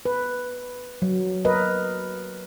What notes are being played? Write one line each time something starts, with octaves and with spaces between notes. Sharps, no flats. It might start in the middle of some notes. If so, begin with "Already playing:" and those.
B4
F#3
A#4 B4 D#5